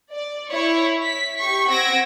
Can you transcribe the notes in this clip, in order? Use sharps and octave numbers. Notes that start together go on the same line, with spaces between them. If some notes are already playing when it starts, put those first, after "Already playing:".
D5
E4 C#5
B6
G4 C#6 B6
C4 F#5 E6 G#6 A#6 D7